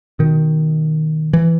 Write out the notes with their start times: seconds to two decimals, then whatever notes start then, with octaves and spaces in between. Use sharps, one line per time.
0.19 B2 D#3
1.33 E3